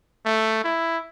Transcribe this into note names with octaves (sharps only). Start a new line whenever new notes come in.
A3
E4